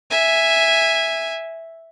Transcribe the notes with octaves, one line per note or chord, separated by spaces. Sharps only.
E5 G#5